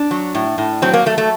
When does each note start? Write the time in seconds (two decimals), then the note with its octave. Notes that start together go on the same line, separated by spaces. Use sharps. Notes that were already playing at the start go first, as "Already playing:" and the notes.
Already playing: D4
0.11 F#3
0.35 A2
0.58 A2
0.82 F#3 C4
0.93 A#3
1.06 F#3 A3
1.18 A3